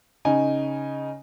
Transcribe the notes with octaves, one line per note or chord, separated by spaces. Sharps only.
C#3 D#4 G#5